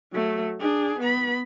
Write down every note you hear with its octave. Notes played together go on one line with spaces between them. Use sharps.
F#3 A3
D4 G#4
B3 B5